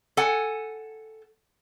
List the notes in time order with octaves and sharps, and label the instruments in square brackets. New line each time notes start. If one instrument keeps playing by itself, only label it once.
[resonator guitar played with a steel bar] A4 F#5 G#5